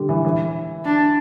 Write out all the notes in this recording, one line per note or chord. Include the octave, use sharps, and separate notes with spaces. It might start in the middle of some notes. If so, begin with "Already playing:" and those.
Already playing: D3 G3
E3
E3
D4